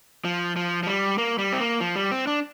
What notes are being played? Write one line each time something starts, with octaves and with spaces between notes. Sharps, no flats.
F3
F3
F3
G3
A#3
G3
C4
A#3
F3
G3
C4
D4